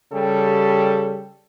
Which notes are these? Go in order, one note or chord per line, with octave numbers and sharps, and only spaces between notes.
C#3 G3 G4 A4